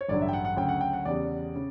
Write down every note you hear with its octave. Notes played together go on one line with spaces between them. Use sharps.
C#5
A1 G2 D3 F#3 D5
E5
G5
F#5
F#5
D2 C#3 F#3 G5
F#5
G5
F#5
E2 C#3 G3 D5
C#3